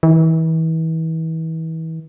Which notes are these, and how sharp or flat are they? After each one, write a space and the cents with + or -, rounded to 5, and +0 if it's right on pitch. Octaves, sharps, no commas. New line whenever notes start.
E3 -35